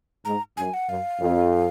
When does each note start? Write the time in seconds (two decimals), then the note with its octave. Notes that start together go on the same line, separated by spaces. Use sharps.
0.25 G#2 A#5
0.57 F#2 G#5
0.74 F#5
0.89 F#2 F5
1.20 F2